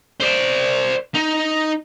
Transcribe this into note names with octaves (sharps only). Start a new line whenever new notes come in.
C5 D5
D#4